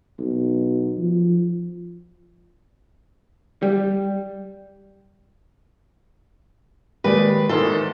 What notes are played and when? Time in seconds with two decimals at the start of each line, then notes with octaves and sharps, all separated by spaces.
0.19 B1
0.98 F3
3.62 G3
7.04 D#2 G#3 G4 B4 D5
7.49 E2 G#2 D#3 A4 C5